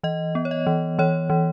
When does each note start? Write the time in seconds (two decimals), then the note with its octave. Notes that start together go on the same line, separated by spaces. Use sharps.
0.03 E3 D#5
0.35 B3
0.45 C#5
0.51 D#5
0.67 E3
0.99 E3 C#5
1.30 E3